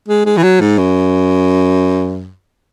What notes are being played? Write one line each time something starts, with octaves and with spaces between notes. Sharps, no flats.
G#3
G#3
E3
F#3
G#2
F#2